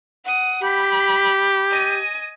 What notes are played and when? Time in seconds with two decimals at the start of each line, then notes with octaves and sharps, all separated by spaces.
0.25 F#5 D#6
0.63 G4 B5
1.70 D#5 G#5